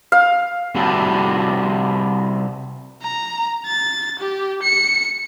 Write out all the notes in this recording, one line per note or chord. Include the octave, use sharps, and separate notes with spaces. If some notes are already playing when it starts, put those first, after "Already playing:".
F5
C3 G3 F#4 A4
A#5
A6
G4
C#7